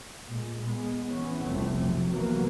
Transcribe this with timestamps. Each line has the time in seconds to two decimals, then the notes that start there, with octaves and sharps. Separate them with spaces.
0.24 A#2 G#3
0.61 G#3 B3
1.10 E3 B3 C#4
1.43 F1 C2 C3 A3 C4
1.79 C3 F#3
2.11 C3 E3 F#3 A#3 B3